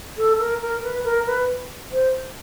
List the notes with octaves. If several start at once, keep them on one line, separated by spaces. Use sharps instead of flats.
A4
A#4
A#4
B4
A#4
B4
C5